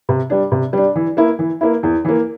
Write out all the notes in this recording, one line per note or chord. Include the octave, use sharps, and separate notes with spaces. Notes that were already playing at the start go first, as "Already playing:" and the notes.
C3
G3 D4
C3
G3 D4
E3
A#3 E4
E3
A#3 E4
E2
E3 A#3